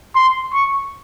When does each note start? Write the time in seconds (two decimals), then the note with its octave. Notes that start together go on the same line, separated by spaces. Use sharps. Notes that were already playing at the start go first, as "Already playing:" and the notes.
0.16 C6
0.53 C#6